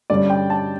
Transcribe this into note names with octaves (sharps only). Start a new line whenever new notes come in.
G2 D3 G3 C#4 D5
G5
A5